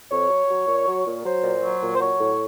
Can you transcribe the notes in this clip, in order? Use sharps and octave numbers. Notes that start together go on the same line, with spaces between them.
F2 C#5
F#3
F#3
A#2
F#3
A#2
F#3 C5
A#2
F#3
A#2
C5
F#3 C#5
A2